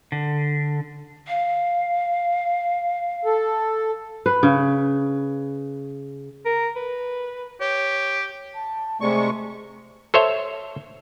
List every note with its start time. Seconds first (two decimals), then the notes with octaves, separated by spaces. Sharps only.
0.12 D3
1.28 F5
3.25 A4
4.26 B4
4.43 C#3
6.46 A#4
6.76 B4
7.61 G4 C#5
8.54 A5
9.01 C3 G#3 A3 D5 C#6
10.14 A4 C5 C#5 E5